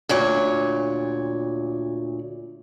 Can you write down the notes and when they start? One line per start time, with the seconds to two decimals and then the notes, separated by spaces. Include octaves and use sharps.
0.09 D2 A#2 C#5